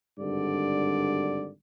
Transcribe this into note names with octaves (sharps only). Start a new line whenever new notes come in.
G#1 G2 D3 D5